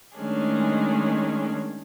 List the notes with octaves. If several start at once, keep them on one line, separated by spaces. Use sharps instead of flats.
D#3 G#3 A3 C#4 D4 G#4